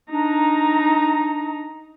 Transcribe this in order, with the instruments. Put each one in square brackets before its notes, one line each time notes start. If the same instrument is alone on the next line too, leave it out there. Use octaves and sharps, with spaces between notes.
[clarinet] D4 [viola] D#4 A#5